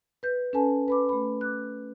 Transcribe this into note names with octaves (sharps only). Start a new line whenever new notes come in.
B4 G6
C#4 A4 B4 G#5 A5
B4 B5 D6
A3 B5
D6 F#6